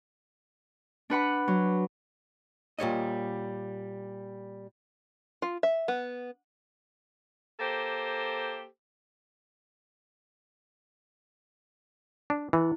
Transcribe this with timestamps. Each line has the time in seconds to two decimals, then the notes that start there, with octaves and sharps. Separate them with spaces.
1.10 D4 B4 F#5 B5
1.48 F#3
2.79 A#2 G3 C#5 D#5
5.42 F4
5.63 E5
5.88 B3
7.60 A#3 G4 A4 C5
12.30 D4
12.53 E3 E4